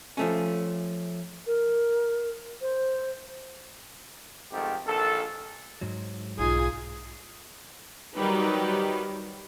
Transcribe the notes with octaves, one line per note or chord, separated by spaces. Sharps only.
F3 A3 C#4
A#4
C5
F2 G#2 D#3 A3 G4
A#1 D#3 A4
G#2 F#3
B1 D#4 F4 G#4 G#5
D#3 F#3 G3 D#4 G4 B4